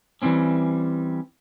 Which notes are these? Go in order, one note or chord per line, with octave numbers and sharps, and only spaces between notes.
E3 F#3 G3 C4 C#4